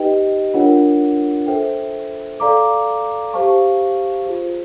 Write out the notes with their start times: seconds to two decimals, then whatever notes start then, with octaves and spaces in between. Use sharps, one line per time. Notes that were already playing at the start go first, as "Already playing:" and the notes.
Already playing: D#4 G4 B4 D#5 G5
0.54 D4 F4 A#4 C#5 F#5
1.47 A4 C5 E5 G5
2.40 A4 D5 F5 A#5 D6
3.33 G4 C5 F5 A5 C#6
4.26 F4 G#4 C5